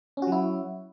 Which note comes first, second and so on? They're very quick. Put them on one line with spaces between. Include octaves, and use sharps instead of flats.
C#4 F#4 F#3 E4